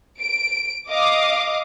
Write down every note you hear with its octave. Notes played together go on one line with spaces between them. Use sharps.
D7
D#5 F5 D6 D#6